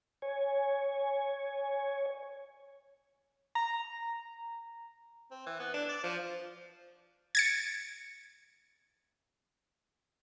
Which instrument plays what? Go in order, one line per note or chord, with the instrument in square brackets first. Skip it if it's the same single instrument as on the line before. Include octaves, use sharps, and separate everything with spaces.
[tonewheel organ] C#5 G#5
[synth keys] A#5
[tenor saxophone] C4
E3
B3
D4
D5
F3
[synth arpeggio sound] G#6 A6 C#7